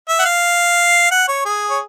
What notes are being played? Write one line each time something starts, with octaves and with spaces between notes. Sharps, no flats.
E5
F#5
F5
F#5
C#5
G#4
C#5